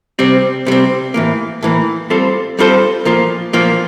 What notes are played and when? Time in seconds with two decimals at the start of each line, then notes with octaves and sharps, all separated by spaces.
0.19 C3 G3 C4
0.67 C3 G3 C4
1.14 A2 E3 A#3
1.63 A2 E3 A#3
2.10 G3 C4 F4 A4 C5
2.59 G3 C4 F4 A4 C5
3.05 A#2 F3 A#3 F4
3.53 A#2 F3 A#3 F4